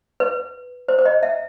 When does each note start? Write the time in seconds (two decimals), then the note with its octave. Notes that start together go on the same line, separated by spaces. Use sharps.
0.20 B4
0.88 C5
0.99 C5
1.05 D#5
1.23 E5